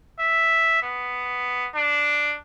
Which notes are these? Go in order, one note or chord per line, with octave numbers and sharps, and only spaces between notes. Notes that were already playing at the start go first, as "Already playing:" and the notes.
E5
B3
D4